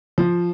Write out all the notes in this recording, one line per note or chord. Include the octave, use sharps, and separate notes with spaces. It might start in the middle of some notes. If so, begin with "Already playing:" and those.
F3